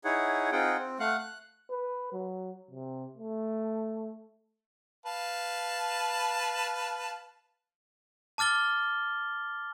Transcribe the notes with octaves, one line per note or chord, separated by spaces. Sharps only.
D#4 E4 G#4 C#5 F#5
C4 D#4 F4 G#4 F#5 G5
C4
A3 F5 F#5 F#6
F#6
B4
F#3
C3
A3
B4 F5 A5
A5 D6 F6 A6 G7